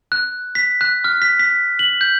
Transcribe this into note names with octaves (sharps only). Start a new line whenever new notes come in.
F#6
B6
F#6
F6
B6
B6
F#7
G6